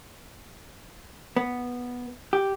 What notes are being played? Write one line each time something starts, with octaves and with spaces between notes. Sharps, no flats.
B3
G4